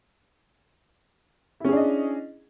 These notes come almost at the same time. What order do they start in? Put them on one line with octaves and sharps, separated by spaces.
E4 C#4 G#4 D4 D#5